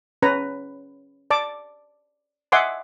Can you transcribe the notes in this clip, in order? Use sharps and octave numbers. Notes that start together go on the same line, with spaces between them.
C#4 B4 A#5
D5 A5 D6
D#5 E5 F#5 G#5 C6 D6